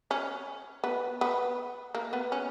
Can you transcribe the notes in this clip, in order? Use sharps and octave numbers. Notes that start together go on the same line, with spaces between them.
C#4
B3
B3
A#3
B3
C#4